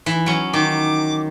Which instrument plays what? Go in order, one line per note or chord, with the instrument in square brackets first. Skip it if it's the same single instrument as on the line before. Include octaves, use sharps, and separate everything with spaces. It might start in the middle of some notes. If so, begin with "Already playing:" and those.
[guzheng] E3
F#3 C#4
[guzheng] D#3 [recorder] D6